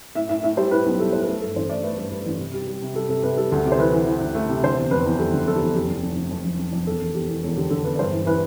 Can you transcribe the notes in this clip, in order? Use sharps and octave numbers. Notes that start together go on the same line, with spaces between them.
A2 E5
A2 E5
A2 E5
G3 C5
A2 B4
B1
G3 A4
A2 C5
B4
A3 A4
G2 A4
A1 C5
A3 D5
A3 B4
G2
G2 B4
A1
C3
G3
G3
C3
G3 A4
C3 A4
C3 B4
G3 A4
D2 A4
C3
C5
E3 B4
E3
E3
D2
A3
C3
D3 C5
E2
F1 B4
E2
G3 A4
D3
F1 A4
G4
E2
F1 G4
F1
F1
F1
F2
F1
F1
F2
E1 A4
E1
E2 G4
E2
E1 A4
D3 G4
D3 A4
E1 B4
D5
G2 C5
E3
E3 B4